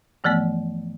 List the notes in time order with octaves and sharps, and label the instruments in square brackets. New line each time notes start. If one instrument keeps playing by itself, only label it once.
[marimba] G2 E3 F3 A3 B3